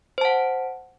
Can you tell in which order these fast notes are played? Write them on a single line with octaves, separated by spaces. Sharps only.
C5 A5 F#5